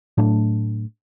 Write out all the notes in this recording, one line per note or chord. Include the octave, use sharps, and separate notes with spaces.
A2 F#3 A3 D4